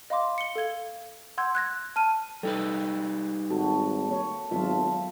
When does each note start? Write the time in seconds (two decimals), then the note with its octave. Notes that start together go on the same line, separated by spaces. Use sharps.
0.10 D#5 F5 B5 C6 D6
0.38 C#7 G7
0.55 A4 F5 G#6 G7
1.38 F#5 C6 E6 G6 G#6
1.55 F#6 G#6 A#6
1.96 A5 F6 D#7
2.43 G3 D#4 A4 B4 G5
3.50 G#1 F#4 A4
4.09 A#3 C#5
4.51 G#1 F#3 B3 F4 E5 F5 A5